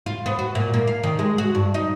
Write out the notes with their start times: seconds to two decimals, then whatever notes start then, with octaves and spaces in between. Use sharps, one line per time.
0.06 F4
0.26 B3
0.39 F#4
0.55 A#2
0.74 A#3
0.87 F5
1.03 D#3
1.19 G#3
1.38 F#4
1.55 G2
1.74 D#4